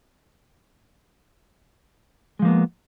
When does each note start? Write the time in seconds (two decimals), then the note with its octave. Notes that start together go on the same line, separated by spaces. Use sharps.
2.39 G#3
2.42 F3
2.45 A#3
2.48 B3